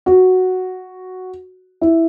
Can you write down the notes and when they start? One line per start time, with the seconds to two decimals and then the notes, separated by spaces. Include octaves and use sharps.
0.06 F#4
1.81 E4